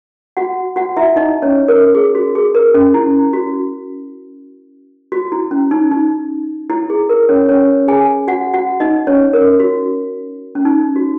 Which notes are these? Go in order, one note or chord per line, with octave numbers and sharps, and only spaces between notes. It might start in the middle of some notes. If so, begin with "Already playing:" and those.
F#4 F#5
F#4 F#5
E4 E5
D#4 D#5
C#4 C#5
A#4
G#4
F#4
G#4
A#4
C#4
E4
F#4
F#4
E4
C#4
D#4
D#4
E4
G#4
A#4
C#4 C#5
C#4 C#5
G#4 G#5
F#4 F#5
F#4 F#5
D#4 D#5
C#4 C#5
A#4
F#4
C#4
D#4
F#4